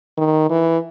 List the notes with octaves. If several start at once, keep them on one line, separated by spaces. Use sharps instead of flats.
D#3
E3